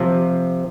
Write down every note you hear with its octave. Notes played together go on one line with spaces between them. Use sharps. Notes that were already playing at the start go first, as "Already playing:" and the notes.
Already playing: C3 F3